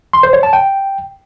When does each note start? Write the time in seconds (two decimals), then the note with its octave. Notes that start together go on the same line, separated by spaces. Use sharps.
0.13 C6
0.23 C5
0.33 C#5
0.43 A5
0.53 G5